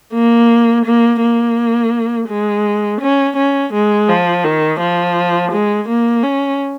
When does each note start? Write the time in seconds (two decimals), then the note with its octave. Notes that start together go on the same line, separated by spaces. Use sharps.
0.13 A#3
0.85 A#3
1.21 A#3
2.29 G#3
3.01 C#4
3.36 C#4
3.73 G#3
4.08 F3
4.44 D#3
4.80 F3
5.51 G#3
5.88 A#3
6.23 C#4